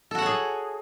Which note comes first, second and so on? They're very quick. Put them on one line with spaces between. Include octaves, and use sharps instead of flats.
A4 F#4 F#5 C#5 G#4